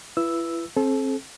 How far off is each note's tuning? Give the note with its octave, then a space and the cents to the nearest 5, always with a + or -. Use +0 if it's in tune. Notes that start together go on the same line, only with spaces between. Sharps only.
E4 +35 B4 +0 E6 +0
C4 +30 A4 -35